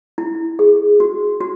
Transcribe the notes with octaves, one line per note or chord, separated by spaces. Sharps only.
E4
G#4
F#4
F#4